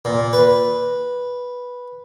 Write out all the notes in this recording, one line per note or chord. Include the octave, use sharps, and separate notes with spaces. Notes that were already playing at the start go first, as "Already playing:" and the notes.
A#2
B4